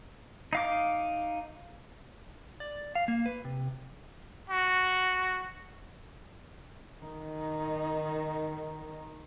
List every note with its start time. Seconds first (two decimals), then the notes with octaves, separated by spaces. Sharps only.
0.53 D#4 F5 D6
2.60 D5
2.95 F5
3.08 A#3
3.26 B4
3.45 C3
4.50 F#4
7.02 D#3 D#4